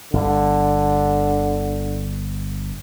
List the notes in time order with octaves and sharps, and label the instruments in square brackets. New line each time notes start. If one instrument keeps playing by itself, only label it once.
[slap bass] G1 [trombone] D3